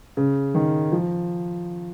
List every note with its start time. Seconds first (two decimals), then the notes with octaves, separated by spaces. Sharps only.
0.17 C#3
0.55 D#3
0.92 F3